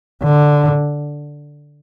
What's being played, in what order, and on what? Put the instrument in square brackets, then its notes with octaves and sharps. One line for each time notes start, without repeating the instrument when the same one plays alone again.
[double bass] D3